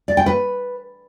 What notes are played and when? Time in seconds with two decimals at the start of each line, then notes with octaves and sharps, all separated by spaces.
0.08 D5
0.17 G5
0.26 B4